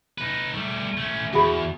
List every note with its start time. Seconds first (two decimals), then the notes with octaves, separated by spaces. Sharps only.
0.18 D#4 B4
0.54 G3 A3
0.97 A3 C#4
1.33 E2 F#4 G#4 B5